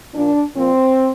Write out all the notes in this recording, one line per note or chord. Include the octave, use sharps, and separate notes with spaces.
A#2 F3 D4
A#2 F3 C4